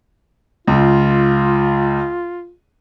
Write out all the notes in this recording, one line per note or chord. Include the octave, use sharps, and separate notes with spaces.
C#2 F4